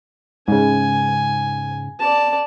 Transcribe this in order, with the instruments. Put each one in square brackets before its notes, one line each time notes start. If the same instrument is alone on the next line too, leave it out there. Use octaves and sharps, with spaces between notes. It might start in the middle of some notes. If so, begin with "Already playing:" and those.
[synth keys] G#2 C#3 [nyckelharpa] G#5
[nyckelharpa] D5 A5